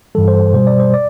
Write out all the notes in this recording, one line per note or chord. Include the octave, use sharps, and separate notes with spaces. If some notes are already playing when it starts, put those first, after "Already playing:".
G2 E3 G3 A4
C5
B2 G3 C5
D5
C5
D5